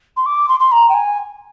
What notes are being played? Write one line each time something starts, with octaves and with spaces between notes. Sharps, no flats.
C6
D6
C6
C6
A#5
G5
G#5